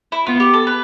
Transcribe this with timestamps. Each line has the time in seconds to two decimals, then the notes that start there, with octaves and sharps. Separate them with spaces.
0.12 E4
0.27 B3 F4
0.40 G4
0.54 A4
0.67 B4